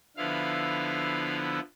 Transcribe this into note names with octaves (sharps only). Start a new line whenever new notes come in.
D3 F3 B3 E4 F5